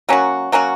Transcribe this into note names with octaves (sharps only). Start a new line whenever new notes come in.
F#3 A#3 C#4 F#4
F#3 A#3 C#4 F#4